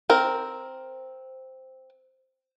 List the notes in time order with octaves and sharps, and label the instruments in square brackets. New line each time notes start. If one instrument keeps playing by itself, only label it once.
[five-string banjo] C4 A#4